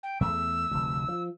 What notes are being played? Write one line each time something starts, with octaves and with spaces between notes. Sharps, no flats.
G5
E2 A3 E6
F1 D2
F3